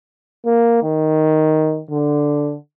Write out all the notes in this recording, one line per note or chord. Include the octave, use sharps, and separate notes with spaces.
A#3
D#3
D3